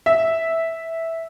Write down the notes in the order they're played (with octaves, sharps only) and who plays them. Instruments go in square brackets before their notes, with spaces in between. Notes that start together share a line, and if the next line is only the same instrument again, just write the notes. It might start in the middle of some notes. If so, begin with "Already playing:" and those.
[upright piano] E5